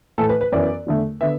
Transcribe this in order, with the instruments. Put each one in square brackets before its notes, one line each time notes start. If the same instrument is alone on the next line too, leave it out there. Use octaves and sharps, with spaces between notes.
[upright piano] A2 E3 A3 A4
B4
B4
F#2 E3 B3 D5
E2 D3 A3
D3 B3 E5